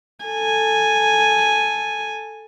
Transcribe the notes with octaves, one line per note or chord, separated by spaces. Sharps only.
A4 G#5